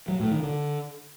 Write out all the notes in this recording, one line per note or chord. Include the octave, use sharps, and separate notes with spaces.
F#3
A2
D#3
D3